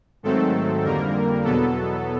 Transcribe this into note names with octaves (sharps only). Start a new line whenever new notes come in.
G#2 D#3 F#3 A3 C4 A4
F2 D3 G3 A#3 A#4
E2 B2 F#3 B3 A4